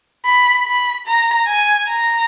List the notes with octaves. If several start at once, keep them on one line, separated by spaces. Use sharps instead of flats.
B5
B5
A#5
G#5
A#5